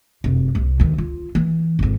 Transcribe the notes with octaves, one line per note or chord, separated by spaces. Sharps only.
F1 F#2
C2 C3
D2 D#3
F4
E3
G#1 F2